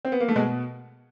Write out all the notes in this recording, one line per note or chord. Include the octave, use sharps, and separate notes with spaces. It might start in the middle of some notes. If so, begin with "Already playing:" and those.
C4
B3
A#3
A3
B2 G#3